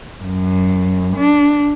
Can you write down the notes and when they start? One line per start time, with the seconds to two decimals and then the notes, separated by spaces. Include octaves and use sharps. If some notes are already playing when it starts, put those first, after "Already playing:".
0.23 F#2
1.16 D4